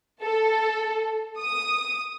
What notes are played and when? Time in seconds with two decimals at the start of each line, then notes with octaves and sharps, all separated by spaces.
0.22 A4
1.39 D#6